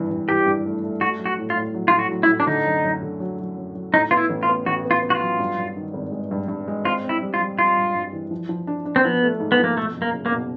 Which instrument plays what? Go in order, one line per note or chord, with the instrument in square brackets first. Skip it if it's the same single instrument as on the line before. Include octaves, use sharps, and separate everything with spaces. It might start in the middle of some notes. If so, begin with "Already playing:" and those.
Already playing: [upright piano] G#1 G2 E3
G2
[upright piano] E3 [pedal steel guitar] G4
[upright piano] G2
A3
A3
[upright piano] A3 [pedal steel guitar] F#4
[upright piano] F#3
[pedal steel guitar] F#4
[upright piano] A2
[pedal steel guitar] F4
[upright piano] A2
F#3
[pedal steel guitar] F4
[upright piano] A2
[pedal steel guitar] F#4
[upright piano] F#3
[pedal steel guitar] E4
[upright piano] A2
[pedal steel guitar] D4
[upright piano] D3 [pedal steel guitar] D#4
[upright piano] F#2
F#2
D3
F#3
F#3
F#2
F#3
[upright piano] A2 [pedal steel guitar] D#4
[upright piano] B3 [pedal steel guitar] F4
[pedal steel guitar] E4
[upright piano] A1
[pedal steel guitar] F4
[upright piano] B3
[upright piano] A1 [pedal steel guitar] F#4
[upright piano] B3
[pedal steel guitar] F4
[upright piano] B3
[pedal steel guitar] F#4
F4
[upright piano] F#3
G2
G2
D#3
G#1
G#3
G2
G2
G#3
[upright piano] C4 [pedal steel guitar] F4
[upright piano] C4
[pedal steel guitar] E4
[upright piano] G3
[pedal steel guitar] F4
[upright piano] G3
[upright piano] G3 [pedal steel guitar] F4
[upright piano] G2
G2
E3
F3
F3
D4
D4
[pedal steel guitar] C4
[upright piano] F3 [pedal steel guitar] B3
[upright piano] A3
G#2
[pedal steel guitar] B3
[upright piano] F3 [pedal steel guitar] A#3
[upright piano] B2 [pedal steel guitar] A3
[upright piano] F#1
[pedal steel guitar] A#3
[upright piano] F#1
[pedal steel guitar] A#3
[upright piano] B2